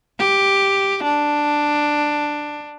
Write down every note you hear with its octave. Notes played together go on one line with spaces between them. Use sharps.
G4
D4